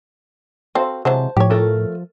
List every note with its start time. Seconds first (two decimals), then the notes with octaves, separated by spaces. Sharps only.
0.75 C4 F#4 A4 C5 F5
1.05 C3 E3 F#3 G#3 C5 A5
1.37 A2 F3 G4 C#5
1.50 A3 A4 A#4